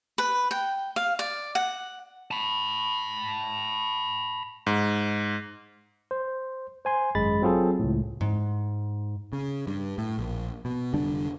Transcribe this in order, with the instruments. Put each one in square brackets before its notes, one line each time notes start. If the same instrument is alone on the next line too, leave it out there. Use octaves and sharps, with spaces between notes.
[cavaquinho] B4
G5
F5
D5
F#5
[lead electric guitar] A5 B5
[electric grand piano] G#2
[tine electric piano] C5
C5 G#5 C6
G#1 F#2 G#3 B5 A6
F#3 C4 F4 G#4 A4
C#2 A2
[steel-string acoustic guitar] G#2
[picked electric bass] C#3
G2
A2
A#1
B2
F1 D3 G3 D4